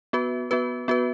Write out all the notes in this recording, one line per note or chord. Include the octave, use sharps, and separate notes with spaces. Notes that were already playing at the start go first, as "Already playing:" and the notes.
B3 F#4 B4
B3 F#4 B4
B3 F#4 B4